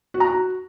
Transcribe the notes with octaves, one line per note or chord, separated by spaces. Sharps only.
F#4
A#5
F#4